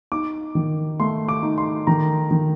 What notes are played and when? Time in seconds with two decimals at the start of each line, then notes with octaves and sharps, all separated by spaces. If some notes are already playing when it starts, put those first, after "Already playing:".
0.12 D#4 D6
0.55 D#3
1.00 A3 C6
1.28 D6
1.43 D#4
1.58 C6
1.87 D#3 A#5
2.31 D#3